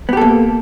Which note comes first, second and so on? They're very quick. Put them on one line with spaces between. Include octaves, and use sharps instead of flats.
B3 G4 A4 A#3